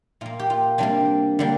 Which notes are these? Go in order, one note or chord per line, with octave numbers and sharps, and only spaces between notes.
A#2 A#3 F4
G4
F4
C3 G3 A#3 D4
D3 G3 A#3